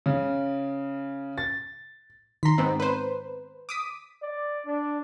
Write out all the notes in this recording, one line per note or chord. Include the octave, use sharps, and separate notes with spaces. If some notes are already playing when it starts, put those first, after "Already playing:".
C#3
A6
D#3 A#5 C6 B6
G#2 B3 C4
B4 C5
D6 D#6 B6
D5
D4